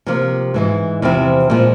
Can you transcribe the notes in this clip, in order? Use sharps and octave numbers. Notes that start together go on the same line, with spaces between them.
C3 F3 A#3
G#2 E3 G#3
E2 C3 F3 C4 E4
A#2 F3 G#3